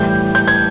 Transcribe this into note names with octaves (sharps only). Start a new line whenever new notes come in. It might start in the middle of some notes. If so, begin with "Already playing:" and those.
Already playing: A2 E3 G3 G6
G6
G#6